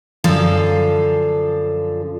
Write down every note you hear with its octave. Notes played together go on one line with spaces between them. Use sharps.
F#2 D3 F3 F4 A4 F5